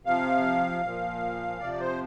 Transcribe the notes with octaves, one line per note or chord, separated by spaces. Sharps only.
C3 F3 F5
A#2 F3
C3 F3 D5
C5